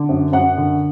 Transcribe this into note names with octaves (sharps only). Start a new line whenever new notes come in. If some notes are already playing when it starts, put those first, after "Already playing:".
Already playing: D3
F#2
F#2 F#5
D3